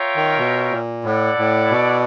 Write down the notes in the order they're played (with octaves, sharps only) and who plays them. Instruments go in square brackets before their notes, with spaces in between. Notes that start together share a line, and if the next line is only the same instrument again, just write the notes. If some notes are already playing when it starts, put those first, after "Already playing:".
Already playing: [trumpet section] F4 A#4 C#5 E5 G5
[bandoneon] D#3
B2
A#2
[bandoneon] A2 [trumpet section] E4 A4 D5 F#5
[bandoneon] A2
B2